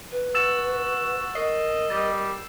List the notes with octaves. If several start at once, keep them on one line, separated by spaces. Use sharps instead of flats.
B4
F#4 E6 A6 E7
A#4 D#5 C7
G3 A6